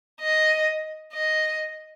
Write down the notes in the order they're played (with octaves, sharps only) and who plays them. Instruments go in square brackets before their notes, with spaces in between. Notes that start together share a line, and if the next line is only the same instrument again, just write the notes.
[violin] D#5
D#5